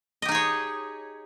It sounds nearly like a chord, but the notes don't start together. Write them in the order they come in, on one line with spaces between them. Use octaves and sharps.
D#5 G4 D#4 G#4 C#5